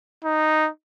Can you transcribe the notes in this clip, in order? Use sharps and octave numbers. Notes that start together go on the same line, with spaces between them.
D#4